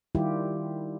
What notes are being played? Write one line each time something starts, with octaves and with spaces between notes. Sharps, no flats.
D#3 G3 E4 F4 G4